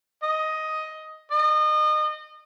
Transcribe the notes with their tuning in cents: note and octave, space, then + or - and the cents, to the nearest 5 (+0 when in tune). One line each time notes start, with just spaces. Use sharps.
D#5 +10
D#5 -30